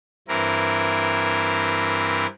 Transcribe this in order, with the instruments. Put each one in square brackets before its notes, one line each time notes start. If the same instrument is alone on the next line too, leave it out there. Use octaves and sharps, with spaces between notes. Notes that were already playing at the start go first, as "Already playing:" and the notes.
[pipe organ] G2 E3 C4 E4 A#4